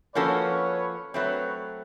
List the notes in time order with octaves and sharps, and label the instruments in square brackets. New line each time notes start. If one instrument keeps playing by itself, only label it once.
[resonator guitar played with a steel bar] F3 A#3 C#4 F#4 A4 [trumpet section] B4 C#5
[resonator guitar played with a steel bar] F#3 A3 C4 [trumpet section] B4 C#5